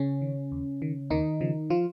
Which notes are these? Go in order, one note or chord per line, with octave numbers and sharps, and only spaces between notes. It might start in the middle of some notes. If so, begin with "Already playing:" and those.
Already playing: C#3 C#4
D#3
D#2
D#3
D#2 D#3 D#4
C#3 F3
F3 F4